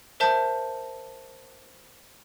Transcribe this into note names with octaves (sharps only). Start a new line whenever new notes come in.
A#4 C5 E5 A5 G6